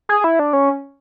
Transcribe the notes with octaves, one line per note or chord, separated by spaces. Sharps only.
G#4
E4
D4
C#4